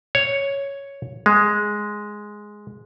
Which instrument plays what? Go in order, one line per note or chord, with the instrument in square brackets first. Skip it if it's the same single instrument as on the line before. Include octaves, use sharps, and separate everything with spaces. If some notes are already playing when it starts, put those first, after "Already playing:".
[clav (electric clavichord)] C#5
G#3